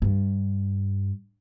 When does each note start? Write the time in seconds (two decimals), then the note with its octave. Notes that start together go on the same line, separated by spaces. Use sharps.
0.02 G2